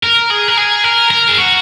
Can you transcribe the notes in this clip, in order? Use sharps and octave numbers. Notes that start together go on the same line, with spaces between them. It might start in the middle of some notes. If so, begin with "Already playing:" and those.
A#4
G#4
A#4
G#4
A#4
A#4
G#4
F#4